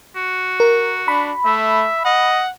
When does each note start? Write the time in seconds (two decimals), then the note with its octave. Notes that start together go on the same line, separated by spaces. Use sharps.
0.16 F#4
0.60 A#4
1.08 D4 B5
1.45 A3 E5
2.05 D#5 F#5